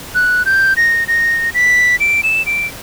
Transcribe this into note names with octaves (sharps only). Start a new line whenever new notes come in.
F#6
G6
A#6
A#6
B6
D7
E7
D7